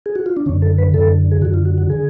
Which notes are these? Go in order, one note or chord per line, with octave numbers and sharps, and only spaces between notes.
G#4
F#4
F4
D4
F#2 D3 C#4
A4
B4
F#2 D3 A4
G#4
F#2 D3 F#4
F4
F#4
F#4
D3 G#4